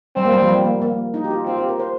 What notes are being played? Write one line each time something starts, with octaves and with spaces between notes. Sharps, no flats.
G3 C4
A#3
G3
F3
G3
A#3
A#3
D#4
G4
F4
C4 F4
G4
A#4
C5